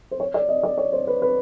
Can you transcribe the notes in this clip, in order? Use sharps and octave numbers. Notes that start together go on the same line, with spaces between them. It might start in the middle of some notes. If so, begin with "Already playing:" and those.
C5
C#5
D5
D#5
D5
C#5
C5
B4
B4